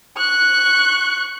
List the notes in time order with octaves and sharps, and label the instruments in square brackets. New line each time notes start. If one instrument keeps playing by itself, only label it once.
[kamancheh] C#6 F#6